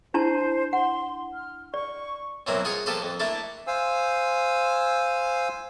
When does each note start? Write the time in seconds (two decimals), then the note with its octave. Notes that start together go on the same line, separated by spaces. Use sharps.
0.14 D4 E4 C5 A5
0.73 F#5 C6
1.34 F6
1.74 D5 C#6
2.47 F#2 B2 F#3 A#3 C4 E4
2.65 F4 G#4 F#5 C#6
2.86 F3 A#3 G4 A4 B4 C5
3.02 F2
3.20 A3 A#3 D4 E4 A4
3.67 C5 F5 G#5 E6